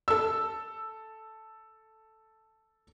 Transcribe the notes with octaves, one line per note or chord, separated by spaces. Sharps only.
A4 E6